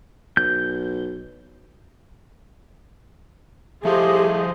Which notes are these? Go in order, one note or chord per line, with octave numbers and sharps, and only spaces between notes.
B1 G6
F3 A3 E4 G4 G#4 C5 D#5 F5